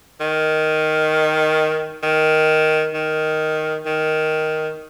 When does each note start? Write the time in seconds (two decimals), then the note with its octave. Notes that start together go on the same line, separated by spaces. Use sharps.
0.21 D#3
2.03 D#3
2.94 D#3
3.86 D#3